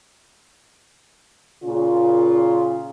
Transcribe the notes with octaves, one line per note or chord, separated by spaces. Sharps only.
A#2 C#3 F4